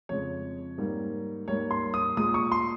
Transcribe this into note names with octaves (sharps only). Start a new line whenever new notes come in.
F2 C#3 G#3 C#5
G#2 G3 A#3
G#2 G3 A#3 C#5
C6
D#6
A#2 G#3 D#6
C#6
C6